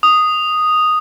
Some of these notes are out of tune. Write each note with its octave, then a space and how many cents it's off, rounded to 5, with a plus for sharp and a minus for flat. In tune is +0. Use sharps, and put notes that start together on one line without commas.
D#6 -5